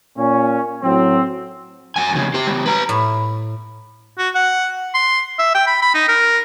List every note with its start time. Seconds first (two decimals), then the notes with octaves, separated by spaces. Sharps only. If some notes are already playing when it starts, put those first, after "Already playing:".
0.17 A#2 C#4
0.82 A2 F#3 C4
1.96 F#2 G#5
2.13 F2 C#3
2.34 G4 C5
2.47 C#3 G3
2.66 B4 A#5
2.89 A2
4.18 F#4
4.35 F#5
4.94 C6
5.39 E5
5.54 G5
5.67 B5
5.82 B5
5.94 D#4
6.08 A#4